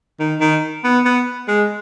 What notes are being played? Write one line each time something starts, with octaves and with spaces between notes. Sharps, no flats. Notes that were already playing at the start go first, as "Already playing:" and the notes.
D#3
D#3
B3
B3
G#3